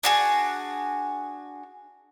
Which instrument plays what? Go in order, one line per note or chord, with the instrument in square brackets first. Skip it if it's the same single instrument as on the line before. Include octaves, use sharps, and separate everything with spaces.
[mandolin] D4 F#4 G#4